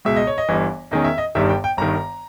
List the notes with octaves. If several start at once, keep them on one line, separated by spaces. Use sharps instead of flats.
C#2 B2 G#3 E5
D#5
C#5
D#5
G1 G2 E3
E2 D#3 G#3 C#4 D#5
E5
D#5
G1 G2 D#3 G3 E5
G5
G5
G1 G2 D#3 A#5